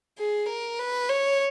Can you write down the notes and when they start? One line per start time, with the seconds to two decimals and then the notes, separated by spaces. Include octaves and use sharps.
0.19 G#4
0.49 A#4
0.80 B4
1.09 C#5